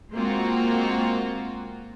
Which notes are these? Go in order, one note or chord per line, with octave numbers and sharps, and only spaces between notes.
G#3 A#3 C4 F4 F#4